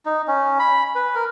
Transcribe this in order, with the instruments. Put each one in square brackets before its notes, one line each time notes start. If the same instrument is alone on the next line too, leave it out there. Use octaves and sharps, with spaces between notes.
[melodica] D#4
C#4
B5
B4
A#4